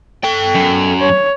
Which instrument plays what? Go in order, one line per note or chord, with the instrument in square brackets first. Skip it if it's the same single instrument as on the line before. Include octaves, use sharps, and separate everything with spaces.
[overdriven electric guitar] A4 G5
[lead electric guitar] F#2
[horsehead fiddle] C#5